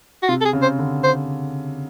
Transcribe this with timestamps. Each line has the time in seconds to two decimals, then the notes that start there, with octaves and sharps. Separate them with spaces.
0.23 F#4
0.29 C3 F4
0.41 A4
0.45 G#4
0.53 C#3
0.62 C5
0.79 D3
1.04 C5